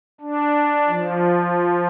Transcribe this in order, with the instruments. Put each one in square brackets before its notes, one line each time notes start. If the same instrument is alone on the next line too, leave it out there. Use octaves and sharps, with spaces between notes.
[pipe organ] D4
F3